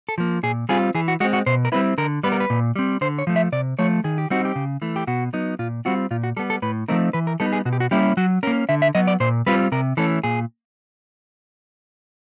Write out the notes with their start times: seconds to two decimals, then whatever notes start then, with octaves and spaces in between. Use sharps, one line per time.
0.09 A4
0.18 F3 A#3
0.43 A#2 G#4
0.69 G3 C4 F4 G#4
0.95 E3 G#4
1.08 F#4
1.20 G#3 F#4
1.25 C4
1.33 F#4
1.46 B2 C5
1.65 A#4
1.72 G3 C4 E4 B4
1.98 D3 A#4
2.23 G3 B3 B4
2.32 A#4
2.40 B4
2.50 A#2
2.76 G3 C4
3.01 D3 C5
3.18 C#5
3.27 F3 A3
3.36 E5
3.52 C3 D5
3.79 F3 A3 C#5
4.04 D#3 G#4
4.18 G4
4.30 G3 C4 D#4 F#4
4.45 G4
4.56 C#3
4.82 E3 A3
4.96 G4
5.07 B2 F#4
5.33 F#3 B3 D#4
5.59 A#2 F4
5.85 G3 C4 F4 F#4
6.11 A#2 F4
6.24 F#4
6.37 G3 B3 A4
6.50 A4
6.62 A2 B4
6.88 F3 A3 C4 D#4 A#4
7.13 E3 B4
7.27 A#4
7.40 G3 B3 D#4 A4
7.53 G#4
7.65 B2 F#4
7.73 G4
7.80 F#4
7.91 G3 A#3 C#4 E4 G4
8.17 F#3 F#4
8.43 C#4 A#4
8.47 A#3
8.69 D3 E5
8.82 E5
8.95 F#3 B3 D#5
9.07 D5
9.20 A#2 C5
9.46 G3 C4 F4 B4
9.72 C3 A#4
9.97 E3 A3 C#4 A4
10.24 A#2 G#4